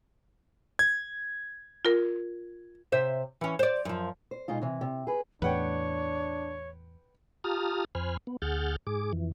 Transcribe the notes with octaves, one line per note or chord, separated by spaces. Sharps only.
G#6
F4 A#4
C3 C5 E5
E3 C#4
C5 D5
F#2 F3
C5
B2 G#3 D#4 F4
C3 E3
C3
G#4 B4
E2 A2 D4 B4 C#5 F#5 G5
F4 G4 A5 A#5 D#6 F6
F2 C5 G#5 B5 F6
B3
D2 G#4 F#5 F6 G6 A6
G#2 G#4 D6
F2 E3